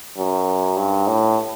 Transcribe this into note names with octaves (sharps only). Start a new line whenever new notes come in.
F#2
G2
A2